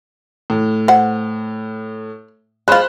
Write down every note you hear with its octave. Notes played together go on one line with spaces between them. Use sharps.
A2
C5 F#5
G#3 F4 C5 B5 F#6